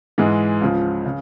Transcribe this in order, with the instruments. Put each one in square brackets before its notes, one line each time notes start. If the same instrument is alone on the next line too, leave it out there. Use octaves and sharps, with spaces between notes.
[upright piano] G#2 E3 G#3
C#2 C#3 F3
C#3